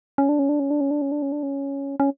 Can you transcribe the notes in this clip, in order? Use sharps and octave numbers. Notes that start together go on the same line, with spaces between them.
C#4
D4
C#4
D4
C#4
D4
C#4
D4
C#4
D4
C#4
D4
C#4
C#4